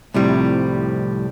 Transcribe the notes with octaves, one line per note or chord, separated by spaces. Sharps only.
C2 A2 C3 F3 G3